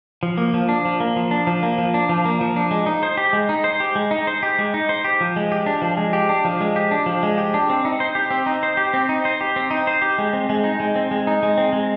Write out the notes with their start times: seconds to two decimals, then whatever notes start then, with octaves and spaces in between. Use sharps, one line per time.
0.23 F3
0.38 A#3
0.54 F3
0.69 D4
0.85 F3
1.00 A#3
1.16 F3
1.31 D4
1.47 F3
1.63 A#3
1.78 F3
1.94 D4
2.09 F3
2.25 A#3
2.41 F3
2.56 D4
2.71 G#3
2.86 D#4
3.03 C5
3.17 G4
3.33 G#3
3.49 D#4
3.64 C5
3.80 G4
3.95 G#3
4.11 D#4
4.27 C5
4.43 G4
4.59 G#3
4.74 D#4
4.89 C5
5.04 G4
5.21 F3
5.36 G#3
5.52 G4
5.66 D4
5.82 F3
5.97 G#3
6.13 G4
6.29 D4
6.45 F3
6.61 G#3
6.76 G4
6.91 D4
7.06 F3
7.23 G#3
7.38 G4
7.54 D4
7.70 C4
7.85 D#4
8.00 C5
8.15 G4
8.31 C4
8.46 D#4
8.63 C5
8.77 G4
8.94 C4
9.09 D#4
9.25 C5
9.41 G4
9.56 C4
9.71 D#4
9.87 C5
10.02 G4
10.18 G#3
10.33 C4
10.49 G#3
10.64 D#4
10.80 G#3
10.96 C4
11.11 G#3
11.27 D#4
11.43 G#3
11.58 C4
11.73 G#3